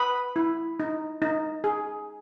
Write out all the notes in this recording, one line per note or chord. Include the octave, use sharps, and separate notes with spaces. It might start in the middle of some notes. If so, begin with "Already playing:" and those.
Already playing: B4 B5 D#6
E4
D#4
D#4
G#4